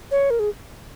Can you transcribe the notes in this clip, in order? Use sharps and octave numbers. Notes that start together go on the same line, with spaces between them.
C#5
A#4
G#4